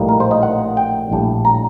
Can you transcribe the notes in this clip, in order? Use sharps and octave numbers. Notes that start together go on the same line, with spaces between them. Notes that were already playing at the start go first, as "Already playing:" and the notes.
Already playing: A#1 A2 G3 A#3 D#4
A#4
C5
D#5
F#5
G5
A#1 A2 G3 D4
A#5